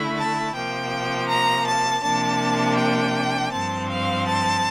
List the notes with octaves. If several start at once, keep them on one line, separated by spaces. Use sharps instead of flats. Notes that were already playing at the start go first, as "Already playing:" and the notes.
Already playing: D3 A3 E4
A5
C3 F3 A#3 G5
A#5
A5
C3 F3 A#3 D4 A5
G5
G2 F3 C4 A5
F5
A5